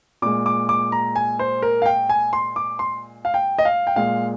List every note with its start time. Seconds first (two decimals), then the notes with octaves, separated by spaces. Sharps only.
0.22 A#2 G#3 D6
0.46 D6
0.69 D6
0.92 A#5
1.16 G#5
1.39 C5
1.62 A#4
1.82 F5
1.86 G5
2.09 G#5
2.33 C6
2.56 D6
2.79 C6
3.25 F5
3.34 G5
3.58 D#5
3.65 F5
3.87 G5
3.96 A#2 G#3 F5